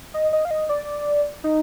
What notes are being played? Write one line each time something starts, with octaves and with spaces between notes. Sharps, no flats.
D#5
D#5
F5
D#5
D5
D#4